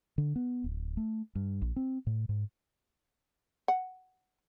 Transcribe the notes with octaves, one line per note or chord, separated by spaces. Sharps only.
D3
B3
D1
A3
G2
A#1
C4
A2
G#2
F#5